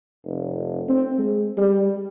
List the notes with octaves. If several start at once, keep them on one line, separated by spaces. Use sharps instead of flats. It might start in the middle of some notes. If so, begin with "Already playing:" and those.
F1
C4
G#3
G3